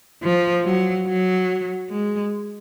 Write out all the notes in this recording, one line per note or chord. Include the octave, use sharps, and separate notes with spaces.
F3
F#3
F#3
G#3